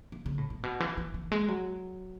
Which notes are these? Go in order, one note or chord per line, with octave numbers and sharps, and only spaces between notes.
D#3
C#3
A2
A2
B2
E3
E3
E3
G#3
F#3